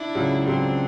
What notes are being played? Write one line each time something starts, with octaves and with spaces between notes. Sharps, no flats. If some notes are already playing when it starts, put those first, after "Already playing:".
Already playing: D4 E4
C#2 C#3 F#3
C#2 C#3 F#3 C4 D4